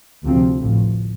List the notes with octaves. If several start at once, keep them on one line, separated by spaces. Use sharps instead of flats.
D2 C3 F3 C4
A1 A2 F3